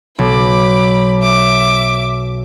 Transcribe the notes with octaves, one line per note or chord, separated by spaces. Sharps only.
B1 B5 D6
E5 D6